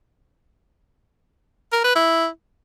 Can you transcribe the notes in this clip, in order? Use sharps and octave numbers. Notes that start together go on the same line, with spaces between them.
A#4
B4
E4